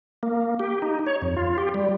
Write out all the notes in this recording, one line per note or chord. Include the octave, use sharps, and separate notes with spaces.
A#3
G4
D#4
C#5
F2
F4
G4
G3